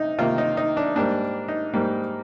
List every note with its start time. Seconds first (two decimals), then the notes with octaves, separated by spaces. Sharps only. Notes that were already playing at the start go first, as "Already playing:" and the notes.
Already playing: C3 D#4
0.19 C3 D#3 A#3 F4
0.38 D#4
0.57 D#4
0.77 D4
0.96 G#2 G3 A#3 D4
1.48 D#4
1.74 G#2 G3 A#3